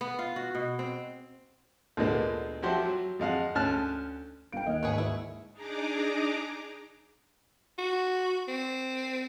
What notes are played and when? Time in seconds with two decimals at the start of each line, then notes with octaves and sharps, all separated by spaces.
0.01 B3
0.19 F4
0.36 F#4
0.55 B2
0.79 C4
1.97 D2 A#2 D3 G#3 A#3 B3
2.62 F3 F#3 F#4 G4 C5 E5
2.86 F#3
3.19 F2 G#3 F5 F#5
3.55 D2 C#4 A5 F6 F#6
4.53 G1 F5 G5 D7
4.66 D#2 D#5 G#5 F6 F#6
4.83 D2 G#2 G#4 B4 C#5
4.98 E4
5.53 D4 D#4 G#4 A#5 D6
7.79 F#4
8.48 C4